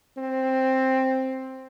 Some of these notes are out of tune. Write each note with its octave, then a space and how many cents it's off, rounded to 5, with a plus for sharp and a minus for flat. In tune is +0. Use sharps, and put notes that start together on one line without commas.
C4 +5